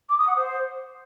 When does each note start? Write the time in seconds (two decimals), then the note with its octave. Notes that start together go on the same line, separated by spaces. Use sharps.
0.09 D6
0.18 D#6
0.27 F#5
0.37 C5